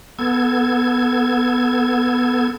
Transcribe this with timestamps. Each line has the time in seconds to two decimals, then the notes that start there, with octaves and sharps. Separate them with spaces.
0.19 B3 A4 G#6